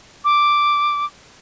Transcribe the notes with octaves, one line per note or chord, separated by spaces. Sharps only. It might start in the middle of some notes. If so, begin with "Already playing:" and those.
D6